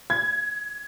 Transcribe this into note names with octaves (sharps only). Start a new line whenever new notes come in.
G#6